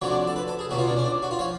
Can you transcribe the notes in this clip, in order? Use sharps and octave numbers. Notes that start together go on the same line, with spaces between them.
F2 D3 F#3 C#5
D4
A4
B4
A4
G#4
C#2 B2 F#3 F#4
F4
D4
C#4
D4
F#4
F4
F3 C#5